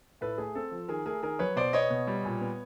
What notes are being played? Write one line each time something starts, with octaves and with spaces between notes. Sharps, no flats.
A2 A4 B4
A3 G#4
C4 A4
F3
D#3 G#4 A#4
A3 G#4 A#4
D#3 G#4 A#4
F#3 B4 C#5
B2 C5 D5
B3 C#5 D#5
B2
G3
A#2
B3